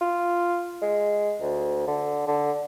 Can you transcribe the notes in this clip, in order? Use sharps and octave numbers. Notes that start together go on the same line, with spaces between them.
F4
G#3
D2
D3
D3